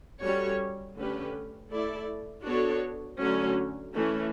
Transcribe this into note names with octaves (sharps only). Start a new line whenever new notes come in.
G3 C#4 F#4 A4 C#5
D3 A3 C#4 G4 B4
A3 E4 A4 D5
B3 D4 F#4 A4 C#5
D3 F#3 A3 C#4
E3 A3 C#4